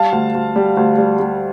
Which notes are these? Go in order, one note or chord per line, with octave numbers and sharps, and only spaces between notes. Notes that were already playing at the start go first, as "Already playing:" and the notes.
Already playing: G3 F5 A5
D2
D2
G3
D2
G3
G3